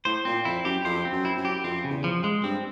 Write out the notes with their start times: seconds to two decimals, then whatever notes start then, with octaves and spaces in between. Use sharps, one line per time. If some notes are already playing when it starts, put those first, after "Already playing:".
0.05 A2 C5
0.25 A#2 C4
0.45 F2 E4
0.65 F#2 G4
0.85 F2 C5
1.05 C4
1.12 F#2
1.25 E4
1.37 F#2
1.45 G4
1.64 F2 C4
1.84 C#3
1.91 E2
2.04 F3
2.24 G#3
2.43 G2 C4